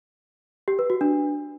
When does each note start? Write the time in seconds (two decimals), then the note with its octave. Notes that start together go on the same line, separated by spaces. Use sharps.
0.68 G4
0.79 B4
0.90 F#4
1.01 D4